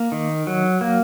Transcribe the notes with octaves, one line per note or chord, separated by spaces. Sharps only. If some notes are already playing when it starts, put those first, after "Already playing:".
Already playing: A#3
D#3
F#3
A#3